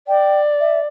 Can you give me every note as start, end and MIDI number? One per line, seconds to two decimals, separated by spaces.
0.08 0.87 74
0.08 0.41 79
0.60 0.80 76